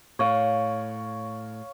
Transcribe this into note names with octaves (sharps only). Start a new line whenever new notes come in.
A2 C#5 F5